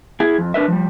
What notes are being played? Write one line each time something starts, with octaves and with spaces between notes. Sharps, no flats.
E4 G#4
F2
D4 A#4 B4 E5
F3 G3